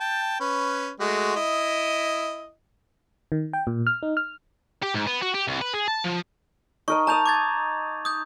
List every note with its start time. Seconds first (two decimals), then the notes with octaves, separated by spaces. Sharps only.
0.01 G5 A5
0.40 C#4 B4
1.00 G#3 A3 F#4
1.36 E4 D#5
3.32 D#3
3.53 G5
3.67 A#2
3.87 F6
4.03 D#4
4.17 F6
4.83 G4
4.94 G#2
5.07 B3
5.22 F#4
5.34 G4
5.47 C2
5.61 B4
5.74 G#4
5.88 A5
6.04 F3
6.88 D#4 A#4 D#5 C#6
7.07 A5 A#5 D#6 G6 F7
7.26 D6 G#6 A6
8.05 D#6 G6